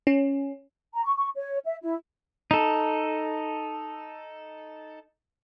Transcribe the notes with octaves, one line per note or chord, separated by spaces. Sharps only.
C#4
A#5
C#6
C#6
C#5
E5
E4
D#4 A4